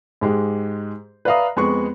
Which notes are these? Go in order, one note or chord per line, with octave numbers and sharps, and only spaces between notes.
G#2 G#3 G4
B4 D5 E5 F5 A#5 D#6
F2 G#3 B3 B4 C#6